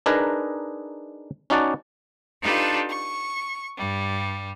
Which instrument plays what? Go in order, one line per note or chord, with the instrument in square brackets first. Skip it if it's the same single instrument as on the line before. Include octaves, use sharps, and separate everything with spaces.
[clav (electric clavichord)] D4 D#4 G#4 A#4 B4 D#5
C#4 D#4 F#4 D5 F#5 A5
[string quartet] D4 D#4 F4 G4 A4 B4
C#6
G2 G3